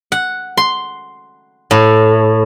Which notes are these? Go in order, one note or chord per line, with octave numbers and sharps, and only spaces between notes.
F#5
C6
A2